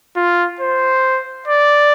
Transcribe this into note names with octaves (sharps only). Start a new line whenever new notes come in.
F4
C5
D5